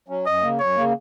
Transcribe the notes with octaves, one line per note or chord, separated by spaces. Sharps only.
F#3 C#4
F#2 D#5
C#3 A#3
F#2 C#5
C#3 A#3